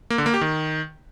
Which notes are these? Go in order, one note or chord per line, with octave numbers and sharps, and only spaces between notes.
A#3
D3
A#3
G4
D#3